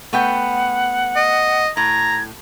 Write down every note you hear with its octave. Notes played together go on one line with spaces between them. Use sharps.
A3 B3 F#5 G5
D#5
A2 A#5 G#6